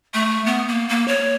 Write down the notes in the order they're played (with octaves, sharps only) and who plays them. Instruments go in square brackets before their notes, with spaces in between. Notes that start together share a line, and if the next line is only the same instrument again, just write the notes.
[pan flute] A3
B3
A#3
A#3
C#5